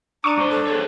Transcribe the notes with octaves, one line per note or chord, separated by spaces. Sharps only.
D4 A#5 C#6 D6 D#7
G2 C5
A4
G#4 C5 C#5